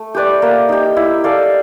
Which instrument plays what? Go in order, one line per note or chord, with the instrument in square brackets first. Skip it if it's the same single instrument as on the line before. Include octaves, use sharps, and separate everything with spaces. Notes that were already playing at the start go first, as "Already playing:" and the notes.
Already playing: [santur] A3
G4 B4 D5
A#3
D#4 G4
E4
A4 D5 F5